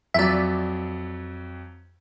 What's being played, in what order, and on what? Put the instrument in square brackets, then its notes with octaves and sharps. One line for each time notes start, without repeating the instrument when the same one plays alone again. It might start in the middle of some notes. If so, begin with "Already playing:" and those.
[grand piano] F2 F#3 [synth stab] D5 E5